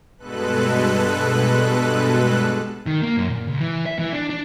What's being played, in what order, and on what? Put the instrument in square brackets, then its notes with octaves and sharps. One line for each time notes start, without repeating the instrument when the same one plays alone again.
[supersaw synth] G2 B2 G#3 A4 B4 F#6
[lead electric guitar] D#3
A#3
F#2
A#2
C#2
E3
E5
E3
D4
D4